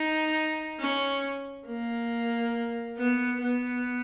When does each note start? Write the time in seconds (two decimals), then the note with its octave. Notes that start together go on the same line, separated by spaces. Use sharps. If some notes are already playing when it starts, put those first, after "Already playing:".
Already playing: D#4
0.80 C#4
1.66 A#3
2.97 B3
3.41 B3